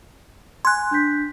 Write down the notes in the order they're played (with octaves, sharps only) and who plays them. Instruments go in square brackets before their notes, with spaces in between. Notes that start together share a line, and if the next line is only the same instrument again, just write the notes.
[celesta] G#5 G#6 [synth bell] C6 F#6
[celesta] D4 G6 B6